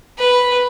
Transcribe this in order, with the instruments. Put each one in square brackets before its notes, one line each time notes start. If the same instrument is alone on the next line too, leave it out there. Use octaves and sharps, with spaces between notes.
[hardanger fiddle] B4